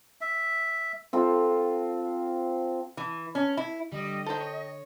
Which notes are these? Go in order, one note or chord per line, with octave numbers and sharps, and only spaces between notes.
E5
C4 F4 A4
E3
C#4
E4
D3 G3 D#5
A4 A#4 C5 G5
C#5